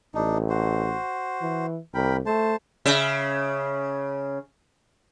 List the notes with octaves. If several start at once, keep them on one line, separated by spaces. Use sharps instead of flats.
A1 D4 D#4
F#4 C5
E3
C2 A#4 G5 B5
A3 C5 A5
C#3 E5